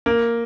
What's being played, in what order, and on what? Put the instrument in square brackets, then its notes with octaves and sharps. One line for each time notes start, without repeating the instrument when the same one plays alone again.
[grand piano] A#3